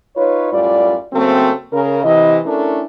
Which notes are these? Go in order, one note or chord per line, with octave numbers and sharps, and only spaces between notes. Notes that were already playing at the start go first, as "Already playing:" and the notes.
D#4 F4 B4 C#5
F#2 A2 G3 F4 D5
C#3 F#3 A3 A#3 C4
C#3 A#4
C3 E3 D#5
A3 C#4 D4 E4 A4 A#4